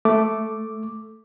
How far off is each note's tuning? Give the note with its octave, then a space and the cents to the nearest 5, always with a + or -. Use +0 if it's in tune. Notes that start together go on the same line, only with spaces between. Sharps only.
A3 +0 D6 +0